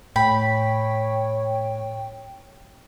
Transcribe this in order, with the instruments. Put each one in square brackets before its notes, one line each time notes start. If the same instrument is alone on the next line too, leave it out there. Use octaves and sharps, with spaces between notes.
[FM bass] A2 [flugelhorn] C#5 [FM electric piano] G5 [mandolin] B5